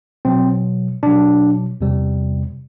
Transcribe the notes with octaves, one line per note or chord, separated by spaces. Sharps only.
B2 F#3 C4
B2 F#3 D4
E2 C3 G3